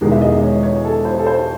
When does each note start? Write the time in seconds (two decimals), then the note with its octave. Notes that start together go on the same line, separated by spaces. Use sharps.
0.01 E1 E2 D#3 G#3
0.12 E5
0.21 D#5
0.42 C#5
0.63 C#5
0.85 A4
1.05 C5
1.19 A4
1.26 C5